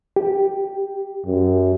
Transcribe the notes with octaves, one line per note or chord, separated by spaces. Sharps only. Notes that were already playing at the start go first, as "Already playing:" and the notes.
G4
F#2